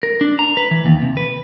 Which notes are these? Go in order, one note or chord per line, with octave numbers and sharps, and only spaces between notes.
A#4
D4
A#5
B4
E3
D#2
C3
B4